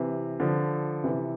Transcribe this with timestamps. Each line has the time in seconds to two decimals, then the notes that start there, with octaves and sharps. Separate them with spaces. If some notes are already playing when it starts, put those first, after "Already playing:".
Already playing: C3 E3
0.40 D3 F3
1.04 C3 E3